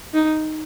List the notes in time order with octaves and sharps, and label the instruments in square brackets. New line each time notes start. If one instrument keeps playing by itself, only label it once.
[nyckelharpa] D#4